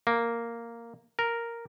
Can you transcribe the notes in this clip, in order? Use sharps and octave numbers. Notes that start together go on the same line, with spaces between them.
A#3
A#4